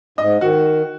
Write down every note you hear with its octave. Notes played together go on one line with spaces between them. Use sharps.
G#2 D#5
D#3 F#4